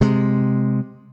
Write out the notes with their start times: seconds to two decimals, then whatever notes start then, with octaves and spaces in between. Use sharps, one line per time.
0.01 C3 G#3